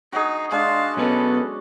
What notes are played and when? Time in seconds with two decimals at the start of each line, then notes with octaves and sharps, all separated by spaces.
0.13 D#4 F#4 G#4
0.52 G#3 D4 F5 A5
0.97 B1 B2 C#4 A4 B4